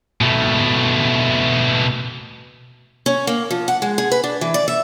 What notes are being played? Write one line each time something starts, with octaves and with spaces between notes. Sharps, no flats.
B2 A3
C#4
A#3
F3
F#5
G#3
G#4
B4
D4
E3
D5
E5